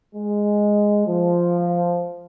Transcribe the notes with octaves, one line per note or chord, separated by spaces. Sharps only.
G#3
F3